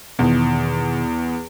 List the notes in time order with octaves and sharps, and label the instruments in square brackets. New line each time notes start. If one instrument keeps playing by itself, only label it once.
[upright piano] E2 [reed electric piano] B2 D#3